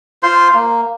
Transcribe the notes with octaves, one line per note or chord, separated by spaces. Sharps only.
F4 C5 C6
A#3